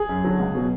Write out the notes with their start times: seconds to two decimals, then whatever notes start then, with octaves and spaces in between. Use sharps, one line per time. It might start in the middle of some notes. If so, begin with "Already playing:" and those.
Already playing: G#4
0.09 F#2
0.24 D3 F#3
0.39 C#2
0.55 B2 F#3